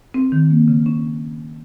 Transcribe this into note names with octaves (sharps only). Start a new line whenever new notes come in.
C4
D#3
A#3
C#3
C#4